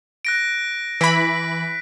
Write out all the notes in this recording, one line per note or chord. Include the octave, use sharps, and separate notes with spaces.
F#6 A#6 D7
E3 B5 B6 D7